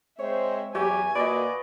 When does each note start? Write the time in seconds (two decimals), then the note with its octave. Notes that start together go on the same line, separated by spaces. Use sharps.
0.19 G#3 C4 C5 C#5 E5
0.75 E2 F#3 G4 C#5 E5 G#5 A5
1.15 A#2 F#4 B4 D5 D#5